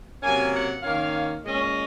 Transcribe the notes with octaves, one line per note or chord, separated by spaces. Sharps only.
C3 F#3 A#3 C#4 G#5
F#5
D#3 A#3 C#4 F5
A#2 G#3 C#4 D#5